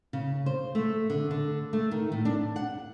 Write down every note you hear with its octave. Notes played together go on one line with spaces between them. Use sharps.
C#3
C5
A3
D3
D3
A3
D#3
A2
D4
F#5